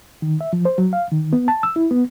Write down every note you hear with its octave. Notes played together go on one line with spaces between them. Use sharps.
D#3
E5
F3
C5
F#3
F5
D#3
B3
A5
E6
E4
B3